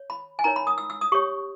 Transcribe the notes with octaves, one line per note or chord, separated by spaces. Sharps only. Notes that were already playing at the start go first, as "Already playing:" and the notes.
Already playing: C#5
B5
G#5
D#4 A#4 C#5 A#5
B5
D#6
E6
E6
D#6
G4 C#5 C#6